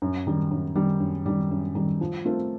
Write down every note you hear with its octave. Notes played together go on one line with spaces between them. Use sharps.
F#2
D#3 G3
F#2
D#3 G3
F#2
D#3 G3
F#2
D#3 G3
F3
A3 C4 F4 A#4